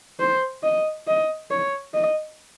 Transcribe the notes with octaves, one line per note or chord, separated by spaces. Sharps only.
C5
D#5
D#5
C#5
D#5